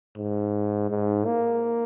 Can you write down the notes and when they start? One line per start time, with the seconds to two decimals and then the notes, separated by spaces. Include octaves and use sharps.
0.17 G#2
0.90 G#2
1.26 A#3